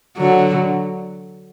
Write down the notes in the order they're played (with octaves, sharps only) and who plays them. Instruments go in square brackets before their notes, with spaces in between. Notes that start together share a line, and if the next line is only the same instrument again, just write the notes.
[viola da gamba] D3 F#3